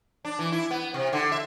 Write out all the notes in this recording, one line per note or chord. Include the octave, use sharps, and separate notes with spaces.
D4
E3
E4
B3
C3
D3
E5